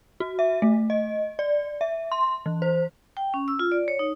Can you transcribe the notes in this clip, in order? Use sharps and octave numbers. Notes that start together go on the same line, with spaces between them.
F#4
E5
A3
D#5
D5
E5
C6
E3
C5
G5
C#4
E6
F4
D5
C#5
D#4